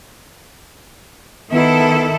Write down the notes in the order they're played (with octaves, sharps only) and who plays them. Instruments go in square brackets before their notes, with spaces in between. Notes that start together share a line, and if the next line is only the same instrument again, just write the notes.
[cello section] D#3 E4 A4 [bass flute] B3